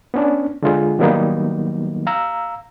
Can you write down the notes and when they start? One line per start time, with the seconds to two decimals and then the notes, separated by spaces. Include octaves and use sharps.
0.14 B3 C#4 D4
0.63 D3 G#3 F4 G#4
0.99 D#3 F#3 G3 A#3 B3 D#4
2.07 F5 A#5 E6